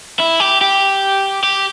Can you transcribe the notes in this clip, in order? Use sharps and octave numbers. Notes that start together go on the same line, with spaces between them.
E4
G4
G4
G4